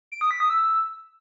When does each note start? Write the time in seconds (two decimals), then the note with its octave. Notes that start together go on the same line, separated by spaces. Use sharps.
0.12 D7
0.21 D#6
0.31 B6
0.40 D#6
0.50 E6